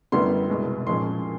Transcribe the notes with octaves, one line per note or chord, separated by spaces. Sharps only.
F#2 D3 G3 B3 E4 C6
C2 B2 G#3
B1 A#2 F3 G#3 C#4 C6